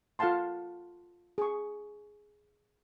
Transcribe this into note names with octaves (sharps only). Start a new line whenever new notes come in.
F4 A4 F5 F#5 A5 C6
G#4 C#6